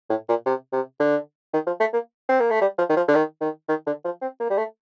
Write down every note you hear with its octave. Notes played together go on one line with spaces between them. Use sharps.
A2
A#2
C3
C3
D3
D#3
F3
A3
A#3
C4
A#3
A3
G3
F3
D#3
F3
D3
D#3
D#3
D#3
D3
F3
C4
A#3
G3
A3